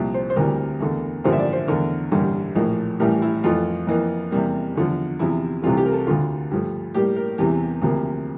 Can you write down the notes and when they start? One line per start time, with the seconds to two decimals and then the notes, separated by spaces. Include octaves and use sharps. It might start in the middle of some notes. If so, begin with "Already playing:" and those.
Already playing: C2 A#2 F3
0.14 C5
0.30 C5
0.36 D2 C3 E3 G3 A#4
0.80 E2 D3 A3
1.24 A1 G2 D3 F3 A#3 C5
1.33 E5
1.38 D5
1.53 C5
1.68 E2 D3 A3 A#4
2.11 A1 G2 D3 G3 A#3
2.55 A#1 A2 F3 A#3
3.00 A1 A2 E3 G3 A#4
3.22 E4
3.44 F2 E3 A3 F4
3.87 F2 E3 A#3
4.31 E2 C3 G3 A#3
4.75 E2 D3 F3
5.19 E2 C3 F3 E4
5.62 C2 C3 E3 A3 F4
5.77 G4
5.86 A#4
5.92 A4
6.07 D2 D3 A3 F4
6.51 G2 F3 A3
6.94 A2 G3 A#3 G4
7.16 A#4
7.38 E2 C3 E3 G4
7.82 D2 C3 F3 A#3